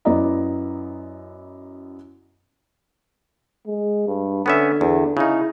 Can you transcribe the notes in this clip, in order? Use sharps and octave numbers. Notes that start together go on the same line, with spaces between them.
F#2 B3 E4 D5 D#5 A#5
G#3
G2
D3 B3 C#4 E5
E2
C#3 D#4 E4